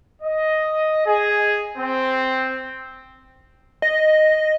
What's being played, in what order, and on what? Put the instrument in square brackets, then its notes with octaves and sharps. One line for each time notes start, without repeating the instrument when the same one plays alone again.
[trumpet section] D#5
G#4
C4
[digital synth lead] D#5